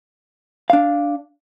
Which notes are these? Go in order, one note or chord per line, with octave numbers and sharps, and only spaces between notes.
D4 F5